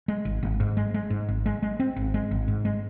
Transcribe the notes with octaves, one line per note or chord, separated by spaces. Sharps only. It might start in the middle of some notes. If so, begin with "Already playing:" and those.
G#3
G#1
G#1
G#2
G#3
G#3
G#2
G#1
G#3
G#3
C4
G#1
G#3
G#1
G#2
G#3